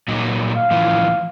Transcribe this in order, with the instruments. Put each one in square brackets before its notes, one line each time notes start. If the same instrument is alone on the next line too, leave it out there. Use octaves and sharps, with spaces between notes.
[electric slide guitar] A#2 F#3 D#4
[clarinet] F5
[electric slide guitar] A2 E3 F3